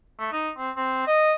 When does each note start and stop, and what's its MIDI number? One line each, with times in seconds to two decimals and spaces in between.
0.19 0.29 57
0.33 0.49 63
0.57 0.71 60
0.76 1.05 60
1.07 1.34 75